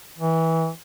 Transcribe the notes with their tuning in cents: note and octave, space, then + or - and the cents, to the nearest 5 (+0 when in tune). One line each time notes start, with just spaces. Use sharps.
E3 -20